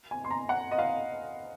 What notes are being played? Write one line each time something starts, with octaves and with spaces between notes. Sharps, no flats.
G#5
C6
A#5
F#5
D#5
F5